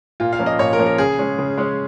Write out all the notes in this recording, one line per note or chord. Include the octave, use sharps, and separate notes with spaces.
A#2 F4
F5
F3 A#3 C#4
D#5
A#2 C#5
A#4
F3 A#3 C#4
A#4
C#3 G#4
G#3 C#4
C#3
G#3 C#4